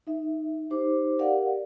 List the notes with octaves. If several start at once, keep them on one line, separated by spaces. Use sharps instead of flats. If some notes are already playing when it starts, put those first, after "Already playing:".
D#4 E5
D#4 G4 C5 D6
G4 A#4 D5 F5 F#5